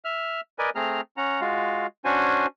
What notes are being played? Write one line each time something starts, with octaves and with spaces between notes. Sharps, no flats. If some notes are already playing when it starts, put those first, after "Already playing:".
E5 F6
A#4 B4 D5 D#5 G#5
A3 C4 G#4 A#5 F6
C#4 F#5 A#5
G#3 F4 F#4 F5
C#4 D4 F#4 C5 G#5